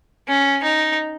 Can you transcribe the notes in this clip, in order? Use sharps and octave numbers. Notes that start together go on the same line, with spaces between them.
C#4
D#4